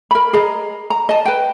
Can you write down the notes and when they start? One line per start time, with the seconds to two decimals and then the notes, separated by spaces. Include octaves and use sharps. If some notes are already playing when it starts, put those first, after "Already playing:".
0.11 A#4 B5
0.33 G#4 D#5 A#5
0.90 A#5
1.09 D#5 A5
1.25 B4 G5